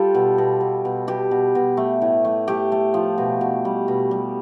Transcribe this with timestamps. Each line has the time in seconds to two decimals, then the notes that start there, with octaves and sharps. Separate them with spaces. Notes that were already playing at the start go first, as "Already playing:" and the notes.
Already playing: G3 F4 G4 A4
0.15 B2
0.38 B2
0.61 B2
0.85 B2
1.07 B2 G4
1.31 B2
1.55 B2
1.77 A3
2.02 A2
2.25 A3
2.48 A3 G4
2.72 A3
2.94 F3
3.18 B2
3.41 B2
3.65 G3
3.88 B2
4.11 G3